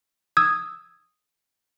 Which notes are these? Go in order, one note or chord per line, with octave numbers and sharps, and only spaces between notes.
D#6 E6 G#6